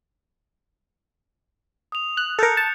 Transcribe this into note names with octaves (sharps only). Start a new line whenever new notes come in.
D#6 F7
F#6
A4 A#4 F#6 G6 C#7
A5